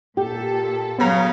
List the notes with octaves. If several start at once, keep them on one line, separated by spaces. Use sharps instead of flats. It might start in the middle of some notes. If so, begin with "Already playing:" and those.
A#2 G4 A4
G2 C#3 F#3 B3 C4 A#5